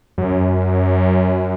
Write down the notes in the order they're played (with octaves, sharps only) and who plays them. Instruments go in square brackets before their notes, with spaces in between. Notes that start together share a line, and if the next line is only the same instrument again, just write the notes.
[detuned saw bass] F#2